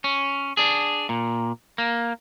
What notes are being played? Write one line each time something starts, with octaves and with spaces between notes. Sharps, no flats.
C#4
D4 G#4
A#2
A#3